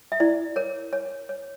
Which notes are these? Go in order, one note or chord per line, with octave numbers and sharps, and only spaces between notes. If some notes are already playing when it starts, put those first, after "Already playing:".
E5
E4 D5
A#4 C#5
C#5
C#5